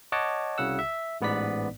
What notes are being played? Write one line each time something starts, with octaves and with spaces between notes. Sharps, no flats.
C#5 D#5 F#5 A5 D6
C2 C#3 F#4 F#5 E6
E5
A1 G#2 B3 B4 D5 B6